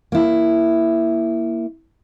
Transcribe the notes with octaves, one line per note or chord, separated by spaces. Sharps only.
A#3 E4